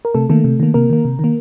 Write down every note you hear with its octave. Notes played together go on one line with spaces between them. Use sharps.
A#4
C3 A3 A4
D#3 A3 A#3 A4
C3
D#3 A#3
C3 A#3 A#4
D#3 A#3
C3
D#3 A#3